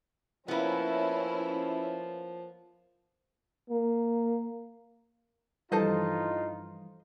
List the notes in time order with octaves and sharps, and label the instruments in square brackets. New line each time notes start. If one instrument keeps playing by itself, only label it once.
[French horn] F3 [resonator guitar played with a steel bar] A#3 B3 [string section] C#4 E4
[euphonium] A#3
[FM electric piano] G2 E3 F3 [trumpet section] D#4 F4 [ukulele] A4 C5 D#5